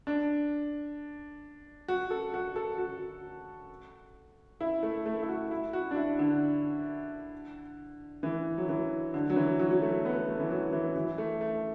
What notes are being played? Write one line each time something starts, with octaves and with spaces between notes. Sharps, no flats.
D4
F#4
A4
F#4
A4
F#4
E4
A3
A3
E4
F#4
E4
F#4
D4
E4
D3
E3
F#3
E3
D3
F#3
E3
F#3
F#3
A3
B3
A3
E3
F#3
E3
E3
A3
A3